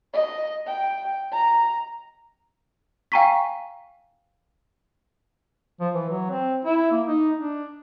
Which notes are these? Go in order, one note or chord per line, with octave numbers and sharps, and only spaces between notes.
D#5
G5
A#5
F5 G5 G#5 A#5 C#6 B6
F3
E3
F#3
C4
E4
A#3
D#4
D4